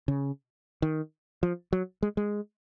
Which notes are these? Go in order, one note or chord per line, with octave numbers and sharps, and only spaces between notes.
C#3
D#3
F3
F#3
G#3
G#3